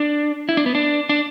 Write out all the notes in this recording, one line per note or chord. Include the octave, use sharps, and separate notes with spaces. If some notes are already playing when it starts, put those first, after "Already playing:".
Already playing: D4
E4
D4
B3
D4
D4